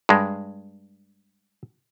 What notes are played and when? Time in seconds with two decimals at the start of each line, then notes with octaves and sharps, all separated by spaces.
0.09 G2 G#3